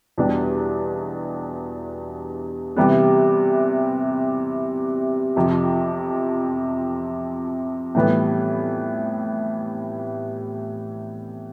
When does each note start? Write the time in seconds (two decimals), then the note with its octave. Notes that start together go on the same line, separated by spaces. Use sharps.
0.18 E2 B2 G3 D4
2.76 C3 E3 G3 B3
5.36 F2 C3 F3
7.95 A2 E3 G3 B3